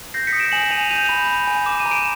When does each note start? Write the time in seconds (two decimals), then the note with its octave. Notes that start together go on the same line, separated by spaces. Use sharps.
0.14 G6 A#6 C7
0.27 B6 C#7
0.32 D#6
0.39 D7 E7
0.52 G#5 E7 F#7
0.71 G#5 D#7 F7
0.90 G6 D#7 F7
1.09 B5
1.28 B5
1.47 G#5
1.66 D6 E7
1.80 D#7
1.86 A#5
1.91 D7 E7